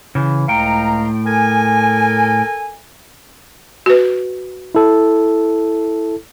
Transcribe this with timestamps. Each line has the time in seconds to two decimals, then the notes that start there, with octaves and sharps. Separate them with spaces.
0.15 C#3 E3
0.48 C#2 A2 F5 G5 A#5
1.26 A4 A#4 G#5
3.86 F#4 B4
4.75 E4 A4